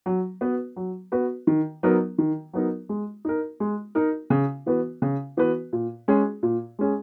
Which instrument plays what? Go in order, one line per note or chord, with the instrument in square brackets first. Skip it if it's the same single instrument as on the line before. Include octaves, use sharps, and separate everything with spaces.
[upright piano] F#3
B3 F#4 B4
F#3
B3 F#4 B4
D#3
F#3 B3 D#4 A#4
D#3
F#3 B3 D#4 A#4
G#3
D#4 A#4
G#3
D#4 A#4
C#3
E3 B3 F#4 B4
C#3
E3 B3 F#4 B4
A#2
G#3 C#4 G#4
A#2
G#3 C#4 G#4